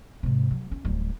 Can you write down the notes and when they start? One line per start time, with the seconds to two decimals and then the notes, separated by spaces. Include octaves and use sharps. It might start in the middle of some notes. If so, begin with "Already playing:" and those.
0.23 G#2 C3
0.51 F#3
0.71 C#4
0.85 D1 G3